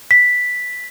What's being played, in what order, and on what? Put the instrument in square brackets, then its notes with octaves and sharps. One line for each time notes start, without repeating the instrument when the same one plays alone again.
[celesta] B6